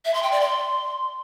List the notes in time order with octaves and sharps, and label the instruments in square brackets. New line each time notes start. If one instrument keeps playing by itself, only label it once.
[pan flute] E5
C6
G5
D5
C6